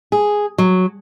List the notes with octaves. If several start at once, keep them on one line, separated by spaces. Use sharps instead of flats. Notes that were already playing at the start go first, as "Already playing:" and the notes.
G#4
F#3